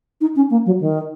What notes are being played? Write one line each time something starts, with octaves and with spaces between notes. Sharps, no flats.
D#4
C#4
A#3
F#3
D#3